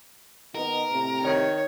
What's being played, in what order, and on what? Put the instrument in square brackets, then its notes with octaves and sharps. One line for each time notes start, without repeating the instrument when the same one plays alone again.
[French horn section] D#3 B3 D#5 [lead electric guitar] A#4
[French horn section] A2 C3 C4
[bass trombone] D#3 [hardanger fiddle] C#5